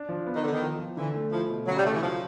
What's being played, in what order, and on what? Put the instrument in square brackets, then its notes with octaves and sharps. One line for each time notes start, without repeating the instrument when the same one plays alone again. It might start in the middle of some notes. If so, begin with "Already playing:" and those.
Already playing: [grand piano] D4
F3
B3
[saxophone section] D#3
[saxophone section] D3 [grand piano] B3
[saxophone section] D#3
[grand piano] F3
F3
[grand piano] D3 [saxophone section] E3
[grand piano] A3
[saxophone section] F3 [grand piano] E4
[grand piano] B2
[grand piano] C#3 [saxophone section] F#3
[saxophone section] G3
[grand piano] C#3 [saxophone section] A3
[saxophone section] E3
[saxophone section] F3 [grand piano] F#3